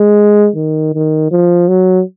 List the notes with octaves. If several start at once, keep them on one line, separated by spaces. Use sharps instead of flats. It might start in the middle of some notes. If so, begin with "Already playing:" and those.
Already playing: G#3
D#3
D#3
F3
F#3